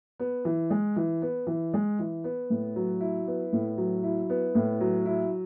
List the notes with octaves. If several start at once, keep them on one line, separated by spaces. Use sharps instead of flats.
B3
E3
G#3
E3
B3
E3
G#3
E3
B3
A2
F#3
E4
B3
A2
F#3
E4
B3
A2
F#3
E4